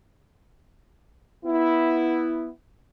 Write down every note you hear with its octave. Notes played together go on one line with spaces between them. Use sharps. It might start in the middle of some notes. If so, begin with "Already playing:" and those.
B3 E4